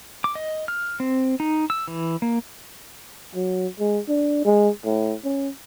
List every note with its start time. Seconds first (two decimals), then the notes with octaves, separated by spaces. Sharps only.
0.24 D6
0.35 D#5
0.68 F6
1.00 C4
1.40 D#4
1.70 E6
1.88 E3
2.22 A#3
3.35 F#3
3.79 G#3
4.08 D4
4.45 G#3
4.85 A2
5.24 C#4